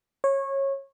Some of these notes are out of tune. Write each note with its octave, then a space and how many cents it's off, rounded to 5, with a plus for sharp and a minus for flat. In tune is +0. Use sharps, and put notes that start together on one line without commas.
C#5 -20